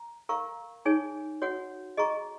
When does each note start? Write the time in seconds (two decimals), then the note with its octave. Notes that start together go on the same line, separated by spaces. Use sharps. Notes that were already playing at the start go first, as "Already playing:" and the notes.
Already playing: A#5
0.29 A#4 F5 A#5 C#6
0.86 D#4 G#4 C#5 G#5
1.42 F#4 C#5 F#5
1.97 G#4 D#5 A#5 C#6